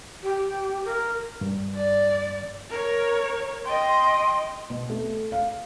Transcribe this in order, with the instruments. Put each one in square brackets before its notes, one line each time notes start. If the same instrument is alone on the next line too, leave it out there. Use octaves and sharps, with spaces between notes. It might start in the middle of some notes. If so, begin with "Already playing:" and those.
[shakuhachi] G4
A#4
[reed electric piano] G2
[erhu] D5
[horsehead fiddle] A#4 C#5
[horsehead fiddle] D#5 G5 [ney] C6
[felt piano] B2
A3
F5